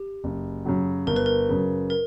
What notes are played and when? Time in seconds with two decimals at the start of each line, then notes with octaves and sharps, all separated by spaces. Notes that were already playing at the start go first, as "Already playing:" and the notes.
Already playing: G4
0.24 F#1
0.65 F#2 C#3 F#3
1.07 G1 A#4
1.16 B4
1.26 A#4
1.49 F#2 C#3
1.90 A#4